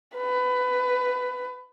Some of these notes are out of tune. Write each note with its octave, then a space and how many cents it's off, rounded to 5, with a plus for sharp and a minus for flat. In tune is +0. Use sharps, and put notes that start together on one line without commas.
B4 +20